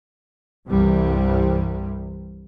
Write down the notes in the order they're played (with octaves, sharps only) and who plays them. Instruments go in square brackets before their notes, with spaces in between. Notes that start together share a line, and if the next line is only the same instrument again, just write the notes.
[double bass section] C2 G2 C3 E3 G3